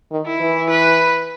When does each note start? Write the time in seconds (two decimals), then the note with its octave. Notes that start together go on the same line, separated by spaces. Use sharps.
0.12 D#3
0.26 E4
0.40 E3
0.70 B4